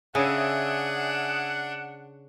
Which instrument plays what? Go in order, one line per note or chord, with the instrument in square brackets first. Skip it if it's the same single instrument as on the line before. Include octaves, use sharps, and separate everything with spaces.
[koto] C#3 [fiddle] D4 [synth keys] E5 G#5 D#6 [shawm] F#5